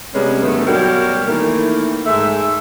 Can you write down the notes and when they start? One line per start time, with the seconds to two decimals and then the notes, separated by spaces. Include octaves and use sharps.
0.14 C3 G3 G#3 B3 C#4
0.44 G2 D3 D#3 F#3 A3 B3
0.66 B2 F#3 G3 A#3 G4 A#4
1.27 D#3 E3 A3 A#3
2.06 G#2 G#3 A3 E5